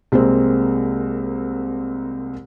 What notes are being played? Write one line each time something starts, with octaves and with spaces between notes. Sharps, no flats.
C2 G#3 A#3 C4